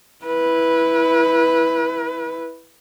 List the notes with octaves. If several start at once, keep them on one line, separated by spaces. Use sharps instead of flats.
E4 B4